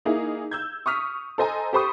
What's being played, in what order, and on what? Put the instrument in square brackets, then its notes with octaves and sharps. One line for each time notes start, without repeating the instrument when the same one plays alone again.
[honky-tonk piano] A#3 D#4 E4 G#4
E6 G6 G#6
C#6 D#6 F6 B6
A4 C5 D#5 G#5 A#5
G4 A4 C5 B5 C#6 D#6